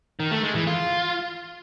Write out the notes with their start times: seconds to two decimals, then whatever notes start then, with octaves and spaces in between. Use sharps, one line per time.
0.20 D#3
0.31 A3
0.43 G#3
0.55 E3
0.67 F4